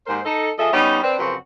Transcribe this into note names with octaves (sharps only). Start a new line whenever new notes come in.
D#2 G#2 A#4 C5
D#4 A4
F3 G#4 A4 D#5 E5
G3 B3 C#4 D#4
C4 D4 B4
F#2 C#3 F3 C4 F#4 B4